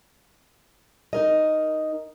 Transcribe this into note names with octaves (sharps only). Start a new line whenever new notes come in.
D#4 A#4 D#5